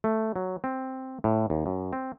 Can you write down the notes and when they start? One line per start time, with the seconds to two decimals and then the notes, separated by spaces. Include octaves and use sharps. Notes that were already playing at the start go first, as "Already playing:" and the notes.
0.04 A3
0.36 F#3
0.64 C4
1.24 A2
1.50 D#2
1.66 F#2
1.93 C4